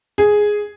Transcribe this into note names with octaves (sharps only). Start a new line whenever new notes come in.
G#4